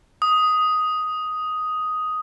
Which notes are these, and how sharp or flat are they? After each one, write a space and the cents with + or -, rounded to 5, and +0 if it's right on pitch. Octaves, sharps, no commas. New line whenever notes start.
D#6 +5